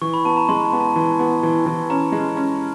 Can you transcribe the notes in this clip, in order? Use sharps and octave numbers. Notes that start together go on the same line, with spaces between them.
E3 C#6
B5
B3 A5
A#5
G#3 C6
A5
B3
A5
E3
B3
E3
E3
C#4 A#5
G#3
C#4